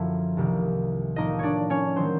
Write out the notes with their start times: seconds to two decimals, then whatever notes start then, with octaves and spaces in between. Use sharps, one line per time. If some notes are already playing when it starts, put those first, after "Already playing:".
Already playing: F#2 D3 F3 E4 E5
0.37 C2 C3 D#3 G3 A#3
1.16 A2 F3 A#3 D#4 D#5
1.39 D4 C#5 D5
1.70 C#4 C#5
1.96 D#3 F#3 A3 C4 C5